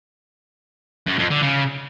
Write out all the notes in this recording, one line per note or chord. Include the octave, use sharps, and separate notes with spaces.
F#2
F2
D3
C#3